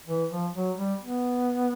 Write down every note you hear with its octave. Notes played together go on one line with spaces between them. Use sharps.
E3
F3
F#3
G3
B3